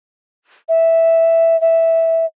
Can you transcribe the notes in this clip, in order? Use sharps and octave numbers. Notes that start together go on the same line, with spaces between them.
E5
E5